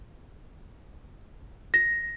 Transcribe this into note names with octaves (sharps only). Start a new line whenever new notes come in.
A#6